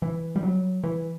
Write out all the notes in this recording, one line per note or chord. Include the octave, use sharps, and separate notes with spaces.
E3
G3
F#3
E3